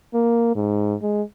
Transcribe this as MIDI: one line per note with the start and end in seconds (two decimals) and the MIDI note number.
0.14 0.53 58
0.55 0.94 44
1.02 1.22 56